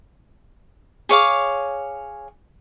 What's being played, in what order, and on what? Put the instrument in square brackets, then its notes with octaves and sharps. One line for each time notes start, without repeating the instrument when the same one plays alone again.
[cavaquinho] G#4 C#5 F5 D6